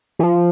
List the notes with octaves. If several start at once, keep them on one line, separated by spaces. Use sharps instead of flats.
E3
F3